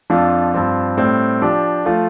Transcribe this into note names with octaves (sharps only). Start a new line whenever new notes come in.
F2 F3 D4 F4
G2 F3 C4 F4
A2 G3 C4
F3 D4 G4
F3 A3 F4